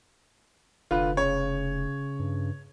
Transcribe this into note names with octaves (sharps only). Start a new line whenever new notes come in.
F1 D3 F4 B4
C#3 C#5
G2